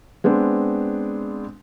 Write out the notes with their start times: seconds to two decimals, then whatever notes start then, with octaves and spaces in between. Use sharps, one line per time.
0.24 G#3 B3 C4 D4